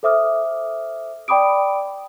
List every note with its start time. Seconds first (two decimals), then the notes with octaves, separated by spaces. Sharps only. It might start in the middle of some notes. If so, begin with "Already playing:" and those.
0.03 A4 C5 E5 D6 D#6 F6
1.28 D5 G5 B5 D6 D#6 D7